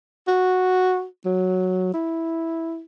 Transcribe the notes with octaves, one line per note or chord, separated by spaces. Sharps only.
F#4
F#3
E4